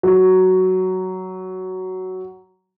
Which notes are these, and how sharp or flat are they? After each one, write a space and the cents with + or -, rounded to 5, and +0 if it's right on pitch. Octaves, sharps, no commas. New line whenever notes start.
F#3 +10